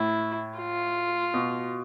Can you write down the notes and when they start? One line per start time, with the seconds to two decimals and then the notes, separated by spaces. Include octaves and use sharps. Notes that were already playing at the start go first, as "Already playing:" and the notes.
Already playing: A2 E4
0.58 F4
1.34 B2